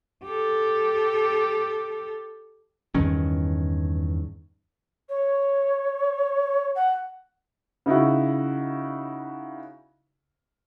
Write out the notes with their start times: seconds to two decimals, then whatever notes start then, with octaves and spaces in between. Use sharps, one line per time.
0.24 G4 A4
2.95 E2 G2 D#3 C#4
5.09 C#5
6.75 F#5
7.86 C#3 D#4 E4 F#4